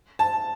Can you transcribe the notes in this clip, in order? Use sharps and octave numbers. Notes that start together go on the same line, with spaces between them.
A5